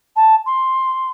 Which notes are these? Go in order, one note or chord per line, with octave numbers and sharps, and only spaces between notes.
A5
C6